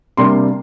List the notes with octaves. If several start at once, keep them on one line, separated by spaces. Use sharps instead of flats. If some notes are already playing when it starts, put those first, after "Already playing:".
C3 G3 A#3 D4 C6